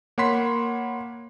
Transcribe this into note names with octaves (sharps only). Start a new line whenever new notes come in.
A#3 C#5 F#5 B5 C6 B6